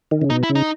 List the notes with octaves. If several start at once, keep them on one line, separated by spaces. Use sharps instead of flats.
D#3
C#3
B2 D#4
E4
C#3
D#4